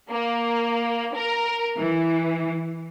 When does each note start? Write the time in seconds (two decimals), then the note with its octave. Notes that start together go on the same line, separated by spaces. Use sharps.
0.11 A#3
1.15 A#4
1.79 E3